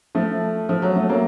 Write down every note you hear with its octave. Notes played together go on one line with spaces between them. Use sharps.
F3 A3
F3
F#3
A3
F#3 A#3